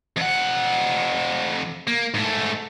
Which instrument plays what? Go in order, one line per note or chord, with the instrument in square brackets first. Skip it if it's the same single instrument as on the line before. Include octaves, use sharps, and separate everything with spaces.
[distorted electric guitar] F2 F#5
A#3
G#2 A3